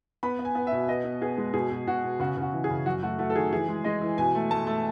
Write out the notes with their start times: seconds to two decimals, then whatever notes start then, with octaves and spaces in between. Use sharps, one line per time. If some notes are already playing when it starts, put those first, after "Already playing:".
0.23 B3 B5
0.39 B3
0.45 G#5
0.55 B3
0.67 E5
0.72 B2
0.88 B3 D#5
1.04 B3
1.21 B3 G#4
1.38 G#3
1.54 B2 G#4
1.71 B2
1.87 B2 F#4
2.04 B2
2.20 C#3 F#4
2.37 C#3 F#4
2.53 E3
2.64 G#4
2.70 C#3
2.86 F#2 F#4
3.03 A3 F#4
3.19 A3 F#4
3.30 A4
3.36 D#3 G#4
3.52 E3 G#4
3.68 G#3
3.84 G#3 D#5
4.02 E3
4.18 B2 G#5
4.35 A3
4.51 A3 A5
4.67 A3